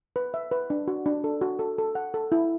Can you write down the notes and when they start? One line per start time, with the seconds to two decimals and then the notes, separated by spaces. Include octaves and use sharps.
0.16 B4
0.34 E5
0.51 B4
0.70 D4
0.88 F#4
1.06 D4
1.24 A4
1.41 F#4
1.59 A4
1.78 A4
1.95 F#5
2.14 A4
2.32 E4